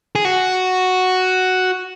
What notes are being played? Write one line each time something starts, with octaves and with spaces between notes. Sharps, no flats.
G#4
F#4